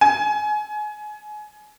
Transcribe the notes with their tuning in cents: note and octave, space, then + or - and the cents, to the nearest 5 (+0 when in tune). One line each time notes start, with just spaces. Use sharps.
G#5 +25